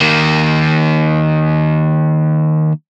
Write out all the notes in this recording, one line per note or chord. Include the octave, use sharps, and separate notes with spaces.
D#3 A#3